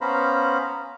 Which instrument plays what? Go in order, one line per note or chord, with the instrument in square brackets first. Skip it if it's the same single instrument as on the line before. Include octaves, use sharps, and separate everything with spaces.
[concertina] B3 C#4 C5 F5 A#5 B5